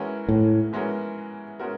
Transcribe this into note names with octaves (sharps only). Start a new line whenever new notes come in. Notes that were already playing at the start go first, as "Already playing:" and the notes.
Already playing: E3 G#3 C#4 F#4 A#4
A2
E3 G#3 C#4 F#4 A#4
G#3 C#4 F#4 A#4